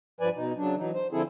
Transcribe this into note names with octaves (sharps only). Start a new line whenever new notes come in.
G2 F3 B4 D5 G#5
B2 D#4
C#3 F#3 D4
E3 F#3 D#4
C5
D3 F3 C4 E4 G#4 A4